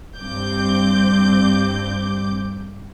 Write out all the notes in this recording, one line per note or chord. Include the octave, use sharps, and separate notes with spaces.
G2 C4 D6 G6